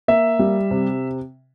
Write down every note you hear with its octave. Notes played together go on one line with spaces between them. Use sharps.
A#3 E5
G3
C3